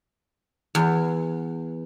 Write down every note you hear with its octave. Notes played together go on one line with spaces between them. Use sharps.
E2